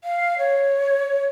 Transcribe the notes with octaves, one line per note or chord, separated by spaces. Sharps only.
F5
C#5